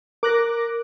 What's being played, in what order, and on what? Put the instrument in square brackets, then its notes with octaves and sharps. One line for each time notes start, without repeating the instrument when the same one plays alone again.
[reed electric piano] A#4 [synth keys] D6 F#6 A#6